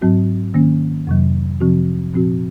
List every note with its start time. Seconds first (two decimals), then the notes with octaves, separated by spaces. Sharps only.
0.01 G#2 F#3 C4 F#4
0.54 D#3 A#3 C#4
1.07 F2 C3 F#3
1.60 C3 F3 C4 F#4
2.14 A#2 F3 C4 F#4